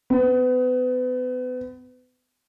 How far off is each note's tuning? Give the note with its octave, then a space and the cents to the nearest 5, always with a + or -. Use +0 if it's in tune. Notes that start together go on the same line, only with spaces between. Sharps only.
B3 +35